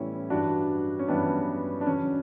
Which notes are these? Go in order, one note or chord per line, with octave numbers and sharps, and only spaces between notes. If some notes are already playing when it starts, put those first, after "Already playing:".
Already playing: A2 E3 G3 B3 C#4 E4
G2 E3 G3 D4 F#4
C#4
G2 E3 G3 B3 D4
D4
E2 C#3 F#3 C#4